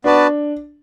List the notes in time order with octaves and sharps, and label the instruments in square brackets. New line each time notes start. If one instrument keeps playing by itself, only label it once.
[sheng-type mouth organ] B3 F#4 B4 D5 A5 [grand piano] D4